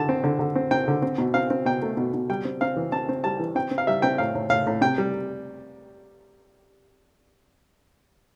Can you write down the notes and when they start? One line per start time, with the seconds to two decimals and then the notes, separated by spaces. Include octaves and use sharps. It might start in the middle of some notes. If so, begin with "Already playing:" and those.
Already playing: D3 A5
0.09 C4
0.24 D3
0.39 D3
0.56 C4
0.71 C4 G5
0.88 D3
1.02 C4
1.18 B2
1.34 C4 F5
1.50 C4
1.65 B2 G5
1.82 A3
1.97 B2
2.14 B2
2.30 G3 G5
2.45 C4
2.61 C4 F5
2.76 E3
2.92 C4 A5
3.09 C4
3.24 G3 A5
3.39 E3
3.55 C4 G5
3.71 C4
3.78 F5
3.87 G3 E5
4.02 C4 G5
4.18 A2 F5
4.35 A2
4.50 A2 F5
4.67 A2
4.81 C3 G5
4.98 G3